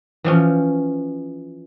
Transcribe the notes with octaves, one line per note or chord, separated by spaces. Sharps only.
E3 F3 C#4